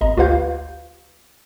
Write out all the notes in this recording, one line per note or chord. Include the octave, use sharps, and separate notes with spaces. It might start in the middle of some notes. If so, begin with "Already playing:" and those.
G#1 D#5 A#5
D2 F4 G4 B4 F5 G6